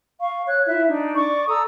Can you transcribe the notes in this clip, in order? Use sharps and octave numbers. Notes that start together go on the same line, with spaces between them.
F5 C#6
C#5 F#6
E4 F4 E5 F#6
D4 D#4
D5 C#6 D6
A4 A#5 D#6 E6